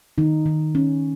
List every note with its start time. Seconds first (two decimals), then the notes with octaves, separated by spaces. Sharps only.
0.18 D#3 D#4
0.46 D#3
0.75 C#4